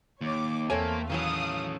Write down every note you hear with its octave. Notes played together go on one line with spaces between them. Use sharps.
D#2 C#5 D6
E2 A3 A#3 C4 A4 C#5 G#5
D#3 E3 F#3 C#4 A4 F5 D#6